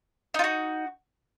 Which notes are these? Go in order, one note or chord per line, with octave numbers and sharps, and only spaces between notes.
D#4 F4 F#4